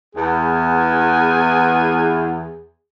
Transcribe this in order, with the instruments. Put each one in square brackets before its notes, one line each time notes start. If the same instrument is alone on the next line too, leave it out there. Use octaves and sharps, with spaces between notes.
[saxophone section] E2 [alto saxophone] G#4